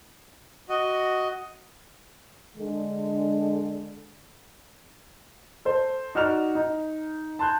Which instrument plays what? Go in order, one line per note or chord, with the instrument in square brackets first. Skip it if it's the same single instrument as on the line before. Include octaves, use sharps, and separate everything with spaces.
[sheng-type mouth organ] F#4 D#5
[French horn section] D3 G#3
[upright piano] A4 C5
D#4 F#4 D5 F6 F7
D#4
A5 C6 F#6 G6